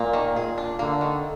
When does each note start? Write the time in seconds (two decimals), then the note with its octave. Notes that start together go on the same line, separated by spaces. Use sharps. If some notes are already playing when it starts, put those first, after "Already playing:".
Already playing: A#2 A#3
0.13 D#3
0.36 A#2 G#4
0.58 D4
0.79 D3 A#3
1.01 D#3